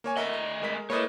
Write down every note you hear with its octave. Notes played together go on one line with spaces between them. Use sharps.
A#3 C#5 G#5
A3 A#4 D#5 E5 F#5
A#5
G#3 A#4 B6
A#3 A4 B4 C#5 D#5